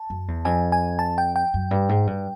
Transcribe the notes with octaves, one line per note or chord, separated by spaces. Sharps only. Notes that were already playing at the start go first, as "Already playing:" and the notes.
Already playing: A5
F#2
E2
F2 G#5
G#5
A5
G5
G5
F#2
G2
G#2
G2